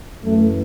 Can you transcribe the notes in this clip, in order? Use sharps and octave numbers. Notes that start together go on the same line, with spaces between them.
F#2 E3 A3